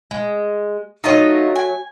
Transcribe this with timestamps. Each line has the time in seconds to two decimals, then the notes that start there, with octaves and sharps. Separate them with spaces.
0.11 G#3
1.04 F#3 A3 D#4 F4 D#5
1.56 G#5